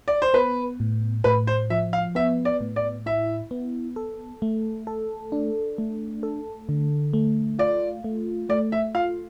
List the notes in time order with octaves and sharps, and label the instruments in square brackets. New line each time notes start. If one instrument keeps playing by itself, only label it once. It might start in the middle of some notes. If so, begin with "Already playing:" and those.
[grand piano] D5
C5
[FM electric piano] B3 [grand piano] B4
[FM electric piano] A2
[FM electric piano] A2 [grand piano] B4
[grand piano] C5
[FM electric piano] F3 [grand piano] E5
[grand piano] F5
[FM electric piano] B3 [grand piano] E5
[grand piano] D5
[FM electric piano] A2
[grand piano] D5
[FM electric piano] E4 [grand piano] E5
[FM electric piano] B3
A4
A3
A4
D4
A3
A4
D3
A3
[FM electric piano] F4 [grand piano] D5
[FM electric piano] A3
[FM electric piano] A3 [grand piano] D5
[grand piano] E5
[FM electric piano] F4 [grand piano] F5